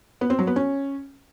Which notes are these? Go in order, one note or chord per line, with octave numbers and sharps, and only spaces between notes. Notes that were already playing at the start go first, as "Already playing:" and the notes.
B3
C4
F#3
B3
C#4